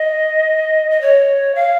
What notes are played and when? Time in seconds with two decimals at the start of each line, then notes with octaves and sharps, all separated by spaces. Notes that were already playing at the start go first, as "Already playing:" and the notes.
Already playing: D#5
0.90 D#5
1.01 C#5
1.55 F5